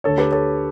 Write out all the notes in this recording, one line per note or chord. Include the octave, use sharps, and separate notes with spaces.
D2 D3 A4 C#5
G4 B4
A4 C#5